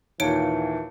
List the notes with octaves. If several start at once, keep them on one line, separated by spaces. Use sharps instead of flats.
D#2 A#2 E3 A#4 C#5 A5 C#7 D7